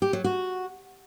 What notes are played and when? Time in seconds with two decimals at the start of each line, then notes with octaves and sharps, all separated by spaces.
0.02 G4
0.13 F#3
0.24 F#4